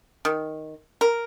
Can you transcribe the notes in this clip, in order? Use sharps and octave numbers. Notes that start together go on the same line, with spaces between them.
D#3
A#4